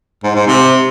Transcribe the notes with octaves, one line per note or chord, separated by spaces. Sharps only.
G#2
G#2
C3